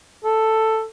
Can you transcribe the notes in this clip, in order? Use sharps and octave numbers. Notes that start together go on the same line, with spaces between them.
A4